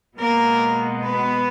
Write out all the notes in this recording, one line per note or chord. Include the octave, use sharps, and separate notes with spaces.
B2 G#3 A#3 B3 A#4
B3 B4